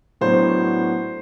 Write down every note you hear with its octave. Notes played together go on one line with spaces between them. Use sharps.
A2 F#3 B3 D4 C5